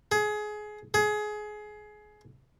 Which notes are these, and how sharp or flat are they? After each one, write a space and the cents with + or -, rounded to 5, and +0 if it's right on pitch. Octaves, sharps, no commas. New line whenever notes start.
G#4 +20
G#4 +20